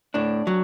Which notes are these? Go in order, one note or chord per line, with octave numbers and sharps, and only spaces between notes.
A2 D4
F#3